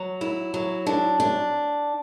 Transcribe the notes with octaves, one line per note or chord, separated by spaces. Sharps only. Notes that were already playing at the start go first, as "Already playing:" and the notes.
Already playing: F#3
E4
F#3
D4
D4